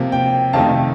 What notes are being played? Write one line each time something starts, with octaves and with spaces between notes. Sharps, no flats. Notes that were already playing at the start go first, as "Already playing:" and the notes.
Already playing: C3 F3 A#3
G5
F2 C3 D#3 A3 D#4 F5 A5